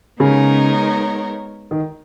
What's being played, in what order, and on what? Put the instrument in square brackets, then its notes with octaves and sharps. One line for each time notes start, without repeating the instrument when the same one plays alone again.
[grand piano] C#3 [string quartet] G#3 B3 D#4 A#4 C#5
[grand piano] D#3